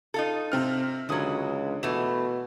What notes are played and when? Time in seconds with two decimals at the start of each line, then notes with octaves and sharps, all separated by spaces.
0.14 D#4 F4 A4
0.52 C3 C4 F6
1.09 C#2 D3 E3 F#3 D#6
1.83 B2 E3 A3 E7